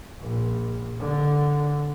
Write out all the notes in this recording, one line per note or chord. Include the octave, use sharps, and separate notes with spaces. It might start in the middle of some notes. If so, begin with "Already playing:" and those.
A#1
D3